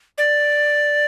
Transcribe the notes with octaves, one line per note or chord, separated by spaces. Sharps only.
D5